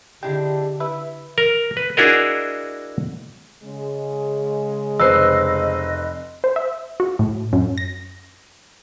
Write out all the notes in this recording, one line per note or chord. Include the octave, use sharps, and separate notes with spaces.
D3 G#3 D4 E4 G4 G5
E4 B4 E5
A#4
B4
D4 E4 F#4 G#4 A#4 D#5
C#3 G#3
F1 B4 C5 D#5 E6 C7
C5
E5
F#4
A2
F#2
A#6